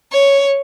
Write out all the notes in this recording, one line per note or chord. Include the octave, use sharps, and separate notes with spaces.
C#5